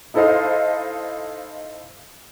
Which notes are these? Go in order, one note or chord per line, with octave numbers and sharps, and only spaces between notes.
D#4 E4 A4 C5 D#5 F5